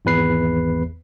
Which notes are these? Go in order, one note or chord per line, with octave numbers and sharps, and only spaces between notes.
G#1 E2 B4 C7